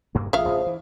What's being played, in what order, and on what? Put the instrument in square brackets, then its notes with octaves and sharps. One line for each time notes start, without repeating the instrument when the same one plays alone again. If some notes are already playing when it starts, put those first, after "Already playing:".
[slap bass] F#1 G2 A#3
[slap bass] A1 [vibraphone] F4 G#4 D#6 [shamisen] E5 F5
[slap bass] A1 D3 [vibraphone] C5
[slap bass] E3